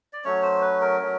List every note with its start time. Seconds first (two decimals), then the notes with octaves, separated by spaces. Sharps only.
0.13 D5
0.24 F#3 A3 C#4 C#5
0.43 C5
0.61 B4
0.81 A#4
0.99 F#3 A3 C#4